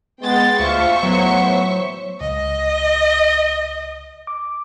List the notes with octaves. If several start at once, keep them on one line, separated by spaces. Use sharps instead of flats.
G#3 B3 G5 C6 A6
D2 F4 C5 E5 C#6
A2 F#3 B3
C#2 D#5
D6